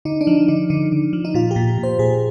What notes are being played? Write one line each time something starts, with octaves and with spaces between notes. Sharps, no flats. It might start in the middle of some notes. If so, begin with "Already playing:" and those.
D3 D#4
D4
F3 D#4
D3 D#4
D3 D#4
D3
F3
D#4
A#2 F4
G4
A#2
A#2
C5
A#2 G#4